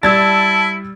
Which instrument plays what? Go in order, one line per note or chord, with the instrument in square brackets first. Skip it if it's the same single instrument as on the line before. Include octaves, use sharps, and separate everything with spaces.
[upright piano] G3 [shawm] E4 [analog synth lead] A5 [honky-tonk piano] E6 G#6 A6